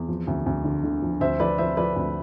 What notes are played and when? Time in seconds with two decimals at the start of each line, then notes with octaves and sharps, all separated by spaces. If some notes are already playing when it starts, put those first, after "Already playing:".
Already playing: E2
0.08 F3
0.27 D2
0.46 D2
0.65 D3
0.84 D3
1.02 F3
1.20 D2 C5 E5
1.40 F3 B4 D5
1.58 F3 C5 E5
1.77 F3 B4 D5
1.96 D2